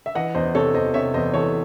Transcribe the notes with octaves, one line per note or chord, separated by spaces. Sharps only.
E5
E3 D#5 F#5
E2 C5 D#5
C3 A4 C#5
E2 C5 D#5
C3 C#5 E5
E2 C5 D#5
E3 A4 C#5